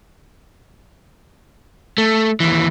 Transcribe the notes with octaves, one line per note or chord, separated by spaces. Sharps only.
A3
D#2 E3